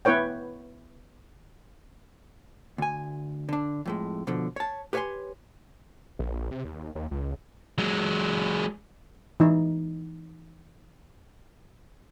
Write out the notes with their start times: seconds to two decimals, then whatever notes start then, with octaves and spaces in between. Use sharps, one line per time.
0.05 B3 E4 B4 C#5 G5
2.78 D2 G#5
3.49 D3 D4
3.86 F2 A2 G#3
4.27 B2 D3 F3
4.56 C#5 A5
4.93 G4 B4 C#5 E5 G#5 C6
6.19 A#1
6.51 C3
6.65 D#2
6.95 D#2
7.11 C#2
7.78 F#3 G#3
9.40 E3 D#4